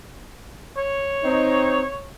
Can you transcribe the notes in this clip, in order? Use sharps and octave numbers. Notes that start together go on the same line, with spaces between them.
C#5
C4 D#4